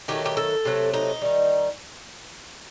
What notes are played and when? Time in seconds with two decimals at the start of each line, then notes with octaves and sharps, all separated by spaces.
0.08 D#3 F#3 A3 G4
0.26 G4
0.37 A4
0.65 C3 F#3 A3
0.94 D#4
1.22 D#3 G3